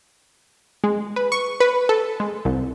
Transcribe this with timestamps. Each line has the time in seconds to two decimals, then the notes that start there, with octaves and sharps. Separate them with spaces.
0.84 G#3
1.16 B4
1.32 C#6
1.60 B4
1.89 A4
2.20 G#3
2.45 C2